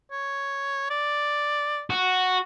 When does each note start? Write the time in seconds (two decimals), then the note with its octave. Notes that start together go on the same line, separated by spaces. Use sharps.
0.12 C#5
0.90 D5
1.90 F#4